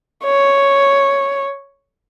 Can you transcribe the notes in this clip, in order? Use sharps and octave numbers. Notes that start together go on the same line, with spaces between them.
C#5